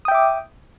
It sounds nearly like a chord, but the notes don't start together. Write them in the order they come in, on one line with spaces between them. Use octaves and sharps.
D#6 G5 E5 D6